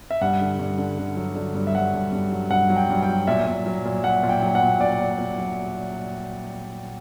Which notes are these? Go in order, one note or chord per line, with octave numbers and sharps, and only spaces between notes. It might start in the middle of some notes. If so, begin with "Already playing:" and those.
E5
G2 F#5
D3
G2
D3
D3
F#3
D3
G2
E5
F#3 F#5
G2
G2
F#3
G2 F#5
F#3
G5
G2
G5
F#3
A#2 E5
A#2
F#3
A#2
F#3 F#5
A#2
G5
F#3
F#5
A#2
A#2 D5
A#2
A#2
F#3